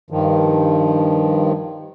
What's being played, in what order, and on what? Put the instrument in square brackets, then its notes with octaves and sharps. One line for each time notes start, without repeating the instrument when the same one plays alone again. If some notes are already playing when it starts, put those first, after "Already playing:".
[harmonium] G2 D#3 F3